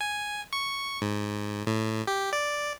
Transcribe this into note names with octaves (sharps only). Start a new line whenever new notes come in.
G#5
C#6
G#2
A2
G4
D5